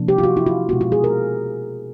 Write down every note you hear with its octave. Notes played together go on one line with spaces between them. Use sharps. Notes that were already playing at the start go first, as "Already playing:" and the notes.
Already playing: C3 F3 A#3 D4
G4
F4
F#4
E4
F4
B2 G#3 B3 E4 F#4
F4
G#4
A#4